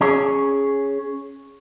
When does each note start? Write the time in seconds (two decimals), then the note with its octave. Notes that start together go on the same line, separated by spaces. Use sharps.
0.01 C#4 G#4 C#5